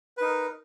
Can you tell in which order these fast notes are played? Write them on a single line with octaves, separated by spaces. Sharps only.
B4 D#4 A#4